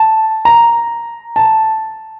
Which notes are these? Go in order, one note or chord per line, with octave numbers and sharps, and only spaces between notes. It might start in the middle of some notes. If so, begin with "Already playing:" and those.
Already playing: A5
A#5
A5